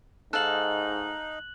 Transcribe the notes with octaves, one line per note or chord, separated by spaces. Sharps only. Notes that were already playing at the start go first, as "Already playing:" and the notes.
G#2 D#4 A4 F5 F#6 F#7